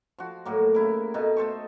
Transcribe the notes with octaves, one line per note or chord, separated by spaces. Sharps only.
F3 F#4
A2 F#3 A#3
C#3 E4 A#4
B2 A3 D#4
A3 A4 C5 C#6